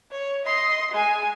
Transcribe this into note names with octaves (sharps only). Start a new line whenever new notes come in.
C#5
D#5 C6
G#3 G#5